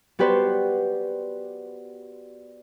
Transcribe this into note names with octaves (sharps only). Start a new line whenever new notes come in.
B3 F#4 G4 B4 C5 D5